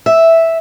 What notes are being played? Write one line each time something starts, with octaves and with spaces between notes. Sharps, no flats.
E5